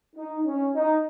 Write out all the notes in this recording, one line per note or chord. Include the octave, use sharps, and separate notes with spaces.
D#4
C#4
D#4